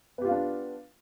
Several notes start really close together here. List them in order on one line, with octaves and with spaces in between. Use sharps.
B3 G4 F4 F5 D4